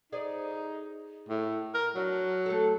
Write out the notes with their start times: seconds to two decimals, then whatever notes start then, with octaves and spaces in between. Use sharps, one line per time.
0.12 D#4 G#4 C5 D5
1.29 A2
1.75 A#4
1.96 F#3 D4
2.46 A3 G4 A4